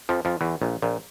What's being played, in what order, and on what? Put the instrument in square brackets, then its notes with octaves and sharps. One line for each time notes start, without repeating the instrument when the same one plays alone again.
[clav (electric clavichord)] F2 F3
F2 F3
E2 E3
A#1 A#2
A#1 A#2